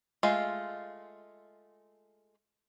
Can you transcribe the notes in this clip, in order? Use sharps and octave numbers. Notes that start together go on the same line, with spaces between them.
G#3 A3 F4